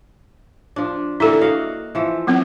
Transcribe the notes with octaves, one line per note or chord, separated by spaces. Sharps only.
F3 D4
D3 E3 A#3 E4 A4
F#4 D#5 F5
E3 F3 A4
F#3 B3 C4